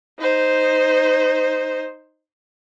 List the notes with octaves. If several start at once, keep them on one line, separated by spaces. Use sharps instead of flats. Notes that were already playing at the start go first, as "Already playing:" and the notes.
D#4 C5